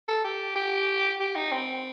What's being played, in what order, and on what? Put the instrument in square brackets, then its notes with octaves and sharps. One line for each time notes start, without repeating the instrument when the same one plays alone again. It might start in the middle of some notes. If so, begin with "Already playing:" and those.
[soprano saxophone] A4
G4
G4
G4
D#4
C4